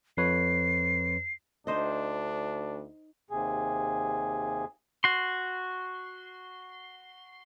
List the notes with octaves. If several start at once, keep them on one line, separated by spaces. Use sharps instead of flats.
F2 B4 C#5 C7
D2 D4 D#4 C5 D#5
D#2 C3 G#4
F#4 C6